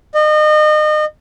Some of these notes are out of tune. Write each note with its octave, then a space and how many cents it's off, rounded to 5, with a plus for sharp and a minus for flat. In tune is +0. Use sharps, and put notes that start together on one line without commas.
D#5 -35